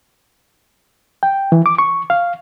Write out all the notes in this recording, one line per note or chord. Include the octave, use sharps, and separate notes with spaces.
G5
E3
D6
C#6
F5